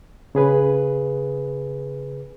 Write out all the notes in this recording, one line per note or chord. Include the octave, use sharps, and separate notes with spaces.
C#3 G#4 B4